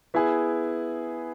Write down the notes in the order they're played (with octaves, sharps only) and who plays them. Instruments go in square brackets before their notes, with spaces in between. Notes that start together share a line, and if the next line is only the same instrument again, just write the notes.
[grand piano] B3 E4 G#4